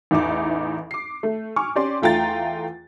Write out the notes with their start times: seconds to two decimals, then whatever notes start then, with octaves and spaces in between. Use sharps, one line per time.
0.11 A1 E2 D#4 E5 D6
0.91 D6 C7
1.23 A3
1.56 G#5 C#6 D6 F6
1.75 C#4 G4 D5 C6
2.02 E2 A3 F4 G5 A#5 A6